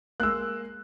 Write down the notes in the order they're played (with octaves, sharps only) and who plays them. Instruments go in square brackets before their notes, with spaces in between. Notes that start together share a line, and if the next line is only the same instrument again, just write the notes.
[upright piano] G#3 A#3 [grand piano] E6 F#6